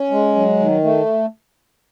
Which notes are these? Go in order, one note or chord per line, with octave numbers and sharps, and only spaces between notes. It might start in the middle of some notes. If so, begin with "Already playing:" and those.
Already playing: C#4
G#3
F#3
D#3
A3